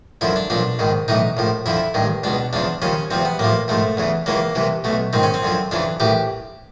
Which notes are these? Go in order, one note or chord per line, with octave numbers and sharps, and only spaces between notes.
F#2 D3 F3 E4
D4
B1 A#2 F3 D4
A#1 G#2 D#3
B1 A2 E3 D#4
A#1 A2 F3
F2 D3 F3 E4
A1 G2 D#3
C#2 B2 D4
E2 C#3 F3 D4
D#2 C#3 F3 C#4
E2 C3 F3 C4
B3
A1 A2 F3 A#3
A#1 G#2 F3 A3
E2 C#3 E3
C#2 C#3 E3 A#3
C2 C3 E3
B1 B2 A3
A#1 G#2 D#3 C4
C#4
C4
F#2 D3 F3
F2 C#3 E3 D4
A#1 A2 E3 G4